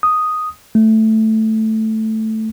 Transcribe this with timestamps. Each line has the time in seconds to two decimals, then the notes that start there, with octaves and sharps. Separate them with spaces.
0.03 D#6
0.75 A3